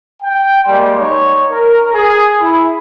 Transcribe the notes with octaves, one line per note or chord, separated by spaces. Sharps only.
G5
G3 G#3 A#3 D5 C6
D#4 C#5
A#4
G#4
E4